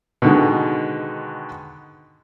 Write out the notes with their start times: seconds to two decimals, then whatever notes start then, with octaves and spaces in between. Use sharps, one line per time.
0.22 B2 D3 D#3 G#3